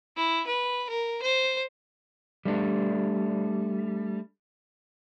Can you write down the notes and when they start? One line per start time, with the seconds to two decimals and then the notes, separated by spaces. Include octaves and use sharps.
0.16 E4
0.47 B4
0.89 A#4
1.23 C5
2.45 G3 A3 D4